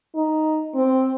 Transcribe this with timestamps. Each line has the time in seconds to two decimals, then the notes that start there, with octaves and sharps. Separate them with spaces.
0.15 D#4
0.75 C4